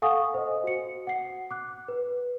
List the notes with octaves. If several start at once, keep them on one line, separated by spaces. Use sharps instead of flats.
A4 F5 F#5 G#5 C#6 D#6
C5 D#5
F#4 C#7
F#5 C7
D6 F#6
B4